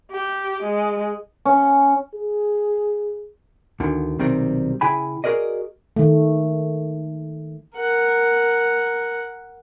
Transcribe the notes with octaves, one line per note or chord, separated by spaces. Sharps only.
G4
G#3
C#4
G#4
D2 D3 D#3
B1 C3 D#3 G3 C4
C#3 E4 G#4 G5 G#5 B5
F#4 G#4 A#4 D5 D#5
D#3 A3
A#4 F#5